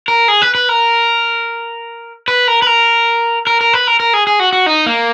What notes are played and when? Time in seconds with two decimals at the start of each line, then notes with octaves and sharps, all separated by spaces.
0.08 A#4
0.28 G#4
0.42 B4
0.55 B4
0.69 A#4
2.28 B4
2.48 A#4
2.62 B4
2.67 A#4
3.47 A#4
3.61 A#4
3.73 B4
3.87 A#4
4.00 A#4
4.13 G#4
4.27 G#4
4.40 F#4
4.53 F#4
4.66 D#4
4.86 A#3